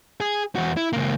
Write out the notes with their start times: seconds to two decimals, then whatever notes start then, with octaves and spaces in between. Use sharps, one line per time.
0.20 G#4
0.56 E2 F#4
0.77 E4
0.93 C#2 A#3